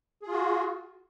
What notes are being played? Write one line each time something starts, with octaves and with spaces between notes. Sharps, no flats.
F4 F#4 G#4